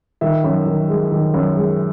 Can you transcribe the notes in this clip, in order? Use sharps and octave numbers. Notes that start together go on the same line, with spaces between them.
D#3 E5
F#2
D#3
G#3
D#3
F#2
G#3